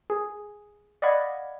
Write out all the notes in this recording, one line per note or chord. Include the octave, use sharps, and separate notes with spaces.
G#4
D5 D#5 F5 F#5 B5 G#6